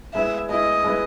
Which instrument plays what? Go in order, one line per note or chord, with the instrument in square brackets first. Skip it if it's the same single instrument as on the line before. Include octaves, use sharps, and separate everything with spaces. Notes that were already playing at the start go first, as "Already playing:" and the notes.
[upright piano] G#3 B3 E4 [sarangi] E5
[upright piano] G#3 B3 E4 [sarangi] D#5
[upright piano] G#3 B3 E4